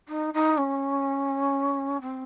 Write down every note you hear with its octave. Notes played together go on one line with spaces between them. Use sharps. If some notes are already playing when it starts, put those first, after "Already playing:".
D#4
D#4
C#4
C4